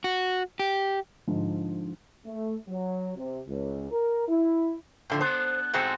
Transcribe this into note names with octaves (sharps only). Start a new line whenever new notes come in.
F#4
G4
G#2 D3 F3
A3
F#3
C3
C#2
A#4
E4
A2 D3 F3
B3 D4 C5
E2 G#2 G#3 C4 F#4 A4